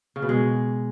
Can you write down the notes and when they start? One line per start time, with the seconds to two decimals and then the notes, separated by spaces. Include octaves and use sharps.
0.16 C#3
0.22 B2
0.29 G#3